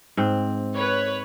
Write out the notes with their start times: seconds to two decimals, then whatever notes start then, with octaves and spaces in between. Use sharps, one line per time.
0.17 G#2 C4
0.75 B4 C#5